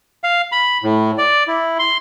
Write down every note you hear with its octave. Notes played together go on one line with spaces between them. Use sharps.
F5
B5
A2
D5
E4
C6